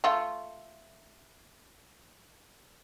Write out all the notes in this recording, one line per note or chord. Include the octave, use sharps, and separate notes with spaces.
A3 F4